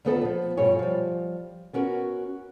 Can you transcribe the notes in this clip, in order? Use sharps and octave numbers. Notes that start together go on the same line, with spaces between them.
D2 D#3 B3 F4 A4 A5
F3 F#3 B3
G2 B2 F4 A4 C#5 G#5
F3 G3
B3 C#4 F#4 A#4